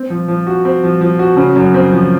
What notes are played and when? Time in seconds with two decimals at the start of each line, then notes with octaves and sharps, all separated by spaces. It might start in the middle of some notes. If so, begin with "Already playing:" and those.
Already playing: C4
0.10 F3
0.28 F3
0.47 F#4
0.65 C4
0.84 F3
1.01 F3
1.19 F#4
1.37 C#3
1.56 F#2
1.74 C4
1.92 F3